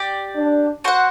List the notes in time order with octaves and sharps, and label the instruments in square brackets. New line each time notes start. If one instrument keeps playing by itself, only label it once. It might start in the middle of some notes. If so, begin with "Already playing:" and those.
Already playing: [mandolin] G4 D5 G5
[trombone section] D4
[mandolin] F#4 C5 F#5